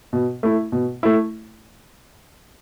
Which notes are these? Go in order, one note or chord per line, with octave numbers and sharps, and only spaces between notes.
B2
A3 E4
B2
A3 E4